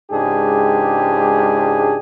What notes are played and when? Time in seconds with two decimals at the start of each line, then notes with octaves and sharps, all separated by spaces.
0.11 C#2 G#2 D4 G4 G#4